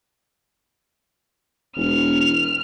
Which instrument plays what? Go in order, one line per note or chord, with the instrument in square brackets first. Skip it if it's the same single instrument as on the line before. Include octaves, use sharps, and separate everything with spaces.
[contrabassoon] E1 [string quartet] F6